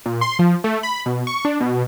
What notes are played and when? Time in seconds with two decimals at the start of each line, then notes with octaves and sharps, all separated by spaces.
0.06 A#2
0.21 C6
0.39 F3
0.64 A3
0.83 B5
1.06 B2
1.27 C#6
1.45 D4
1.60 B2